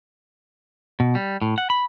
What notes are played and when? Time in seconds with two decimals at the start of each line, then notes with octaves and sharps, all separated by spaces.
1.00 B2
1.15 G3
1.42 A2
1.58 F#5
1.70 B5